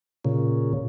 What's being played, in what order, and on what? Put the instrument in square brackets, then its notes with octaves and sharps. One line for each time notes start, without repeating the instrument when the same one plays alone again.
[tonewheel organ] A#2 C#3